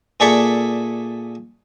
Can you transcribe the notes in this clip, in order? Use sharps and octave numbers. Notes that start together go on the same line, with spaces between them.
A#2 G#4 A4 D5 E5 C#6